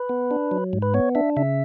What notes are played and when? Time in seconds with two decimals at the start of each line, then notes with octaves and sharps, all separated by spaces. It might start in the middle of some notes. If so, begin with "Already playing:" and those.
Already playing: B4
0.09 B3
0.31 D4
0.51 F#3
0.73 G#2
0.82 B4
0.94 B3 C#5
1.15 D4 E5
1.36 C#3 E5